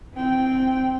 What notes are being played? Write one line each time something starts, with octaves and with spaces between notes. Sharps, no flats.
C4 G5